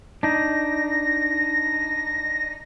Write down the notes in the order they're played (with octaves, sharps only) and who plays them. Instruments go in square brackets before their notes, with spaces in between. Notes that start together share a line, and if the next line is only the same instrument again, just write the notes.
[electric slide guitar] D4 D#4 [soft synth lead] A#6